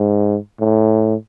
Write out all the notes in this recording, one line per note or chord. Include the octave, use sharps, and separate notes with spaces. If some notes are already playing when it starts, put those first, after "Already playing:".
Already playing: G#2
A2